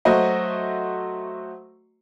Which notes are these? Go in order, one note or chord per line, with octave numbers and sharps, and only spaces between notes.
F#3 A3 F#4 C5 D#5